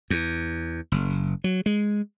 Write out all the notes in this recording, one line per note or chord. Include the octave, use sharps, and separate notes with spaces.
E2
F#1
F#3
G#3